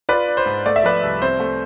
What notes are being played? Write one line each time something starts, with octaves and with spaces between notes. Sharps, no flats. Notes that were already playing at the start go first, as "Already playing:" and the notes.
F4 B4 D5
D4
C5
G#2
A3 D5
E5
F3 B4 D5
C2
C4 C5
A3